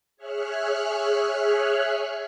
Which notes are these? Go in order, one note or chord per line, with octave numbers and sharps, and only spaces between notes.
G#4 C#5 E5 F6 F#6